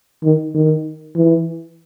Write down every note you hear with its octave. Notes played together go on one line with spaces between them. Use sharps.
D#3
D#3
E3